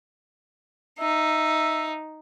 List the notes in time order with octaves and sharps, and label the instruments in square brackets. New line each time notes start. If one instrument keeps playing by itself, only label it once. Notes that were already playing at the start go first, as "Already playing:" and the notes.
[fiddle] D#4 [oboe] E5